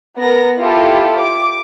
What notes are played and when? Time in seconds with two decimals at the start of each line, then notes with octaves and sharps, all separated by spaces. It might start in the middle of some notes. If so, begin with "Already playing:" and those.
0.18 B3 A#4 A#6
0.60 E4 F4 G4 A4
1.20 D6